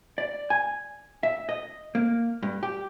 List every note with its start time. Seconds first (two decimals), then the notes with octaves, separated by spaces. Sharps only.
0.18 D5
0.50 G#5
1.23 E5
1.49 D#5
1.95 A#3
2.43 G2
2.63 G4